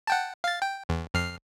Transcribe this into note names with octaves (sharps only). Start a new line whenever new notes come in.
F#5 G5 A5
F5 A6
G5
E2
F2 F6 C7